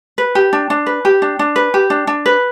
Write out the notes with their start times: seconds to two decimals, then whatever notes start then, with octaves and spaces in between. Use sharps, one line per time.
0.18 B4
0.35 G4
0.53 D4
0.70 D4
0.86 B4
1.05 G4
1.22 D4
1.39 D4
1.56 B4
1.74 G4
1.90 D4
2.07 D4
2.26 B4